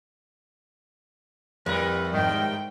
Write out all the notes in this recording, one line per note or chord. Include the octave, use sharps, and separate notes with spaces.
F2 A2 G3 A#4 B4
G#2 D#3 G5